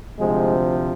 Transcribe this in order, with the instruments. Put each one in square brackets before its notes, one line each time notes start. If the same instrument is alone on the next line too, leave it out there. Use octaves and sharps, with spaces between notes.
[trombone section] D2 C3 F3 G#3